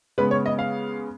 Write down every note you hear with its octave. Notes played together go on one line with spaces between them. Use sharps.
C#3 G#3 B3 B4
C#5
D#5
F5